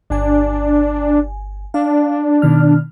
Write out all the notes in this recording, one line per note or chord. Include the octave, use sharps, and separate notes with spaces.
G1 D4 G#5
D4 F5
B2 D#3 F6